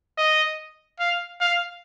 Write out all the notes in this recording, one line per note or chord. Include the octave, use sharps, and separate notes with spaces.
D#5
F5
F5